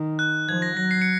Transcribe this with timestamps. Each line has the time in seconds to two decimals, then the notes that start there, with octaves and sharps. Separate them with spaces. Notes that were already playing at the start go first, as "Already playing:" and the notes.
Already playing: D#3
0.19 F#6
0.49 F3 G#6
0.62 A#6
0.77 F#3 A#6
0.91 C7
1.02 C#7